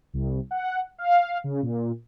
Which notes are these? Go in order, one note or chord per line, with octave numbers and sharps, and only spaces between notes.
C2
F#5
F5
C#3
A#2